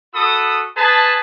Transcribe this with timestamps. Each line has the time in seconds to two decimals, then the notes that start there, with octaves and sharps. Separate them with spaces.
0.14 F#4 A4 B5 D#6
0.77 G#4 B4 A5